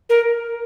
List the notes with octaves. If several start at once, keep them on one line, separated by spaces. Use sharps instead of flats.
A#4